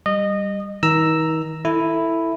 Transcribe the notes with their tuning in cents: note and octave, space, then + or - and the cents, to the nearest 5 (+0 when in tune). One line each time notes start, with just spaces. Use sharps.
G3 +0 D#5 -20
D#3 +40 A#5 +0 E6 +0
E4 +0 A4 +15